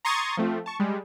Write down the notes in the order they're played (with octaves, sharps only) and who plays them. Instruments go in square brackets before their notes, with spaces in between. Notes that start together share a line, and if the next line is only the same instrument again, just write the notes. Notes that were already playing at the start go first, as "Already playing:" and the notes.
[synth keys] A#5 C6 C#6 D#6 G#6 A6
F3 A3 C4 F4
A5 C#6
G3 G#3